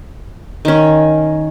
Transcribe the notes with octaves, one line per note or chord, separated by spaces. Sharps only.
D#3 C#4